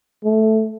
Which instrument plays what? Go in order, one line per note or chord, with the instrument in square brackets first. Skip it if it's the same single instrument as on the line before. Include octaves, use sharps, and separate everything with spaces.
[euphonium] A3